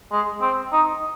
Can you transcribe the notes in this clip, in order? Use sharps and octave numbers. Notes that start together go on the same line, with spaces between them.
G#3
C4
D#4